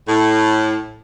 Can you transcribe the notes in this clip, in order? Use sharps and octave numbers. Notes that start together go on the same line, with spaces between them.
A2